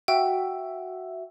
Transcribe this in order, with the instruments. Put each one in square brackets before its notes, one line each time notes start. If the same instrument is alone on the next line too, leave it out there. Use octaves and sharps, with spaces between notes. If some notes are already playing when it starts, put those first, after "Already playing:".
[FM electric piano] F#4 E5 [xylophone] G5